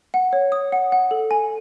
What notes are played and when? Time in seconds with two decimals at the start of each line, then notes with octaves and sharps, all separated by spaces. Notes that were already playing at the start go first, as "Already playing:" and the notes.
0.14 F#5
0.33 C#5
0.52 D#6
0.72 F#5
0.92 F#5
1.11 A4
1.31 G#5